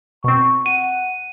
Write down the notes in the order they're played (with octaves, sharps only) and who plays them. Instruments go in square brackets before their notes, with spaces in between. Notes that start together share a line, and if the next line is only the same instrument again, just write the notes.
[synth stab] B2 C4 [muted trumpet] C#6
[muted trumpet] F#5 [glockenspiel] D#7